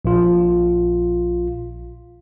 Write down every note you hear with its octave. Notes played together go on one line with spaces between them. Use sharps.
A#1 F4